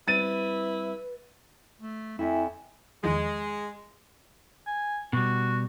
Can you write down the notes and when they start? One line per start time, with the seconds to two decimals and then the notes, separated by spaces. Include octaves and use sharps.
0.08 G3 C4 E4 B4 A6 D#7
1.81 A3
2.19 F2 E4 E5 G5 G#5
3.04 E2 D#3 F3 G#3
4.66 G#5
5.13 B2 G3 F#4